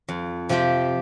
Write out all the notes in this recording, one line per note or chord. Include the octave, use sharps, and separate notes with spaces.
F2
C3 F3 C4 G4